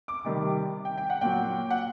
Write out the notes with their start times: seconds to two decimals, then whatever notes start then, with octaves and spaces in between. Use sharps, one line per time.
0.08 D6
0.24 C3 D#3 G3
0.85 G5
0.98 G5
1.10 F#5
1.21 A#2 F#3 G5
1.70 F#5